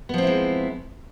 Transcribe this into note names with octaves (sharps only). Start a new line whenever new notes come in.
F3 G#3 B3 C4 E4